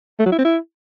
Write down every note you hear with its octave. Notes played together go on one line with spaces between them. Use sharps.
A3
F#3
E4
C4
E4